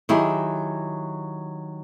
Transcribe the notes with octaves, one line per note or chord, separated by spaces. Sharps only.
D#3 F#3 E4 G4 G#4